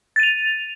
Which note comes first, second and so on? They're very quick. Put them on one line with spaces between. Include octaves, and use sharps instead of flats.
A6 D#7 F7